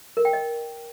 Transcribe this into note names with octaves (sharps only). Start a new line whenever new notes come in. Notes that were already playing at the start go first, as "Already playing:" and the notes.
A#4
G5
D#5